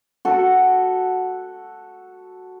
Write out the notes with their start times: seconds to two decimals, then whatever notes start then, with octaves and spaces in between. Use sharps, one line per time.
0.25 F#4 A4